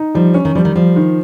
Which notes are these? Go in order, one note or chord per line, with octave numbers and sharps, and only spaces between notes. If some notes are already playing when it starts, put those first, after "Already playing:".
Already playing: D#4
F3 G3
C#4
D#3
F3 G3
D#3
F3 G3
D#3